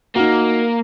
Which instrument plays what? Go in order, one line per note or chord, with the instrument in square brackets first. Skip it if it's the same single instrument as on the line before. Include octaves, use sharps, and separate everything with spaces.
[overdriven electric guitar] A#3 [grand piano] D#4 F#4 [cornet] A#4